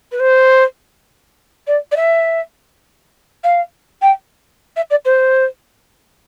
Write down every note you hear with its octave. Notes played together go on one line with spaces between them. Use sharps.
B4
C5
D5
D5
E5
F5
G5
E5
D5
C5